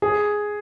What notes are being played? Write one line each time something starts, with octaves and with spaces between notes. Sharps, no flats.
G#4